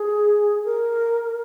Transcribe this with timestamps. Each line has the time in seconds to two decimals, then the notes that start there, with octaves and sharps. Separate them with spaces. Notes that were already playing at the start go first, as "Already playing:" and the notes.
Already playing: G#4
0.64 A#4